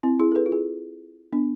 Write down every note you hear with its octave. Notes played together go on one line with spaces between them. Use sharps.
C4 E4
E4 G#4
A4
G#4 B4
F4
E4 G#4
B3 D4